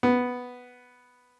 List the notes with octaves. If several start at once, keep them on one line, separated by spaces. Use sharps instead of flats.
B3